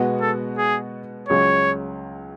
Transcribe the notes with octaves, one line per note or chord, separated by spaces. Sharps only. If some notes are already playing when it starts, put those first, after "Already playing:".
Already playing: B2 G#3 B3 F#4
A4
G#4
C#2 C#3 F#3 C#4 C#5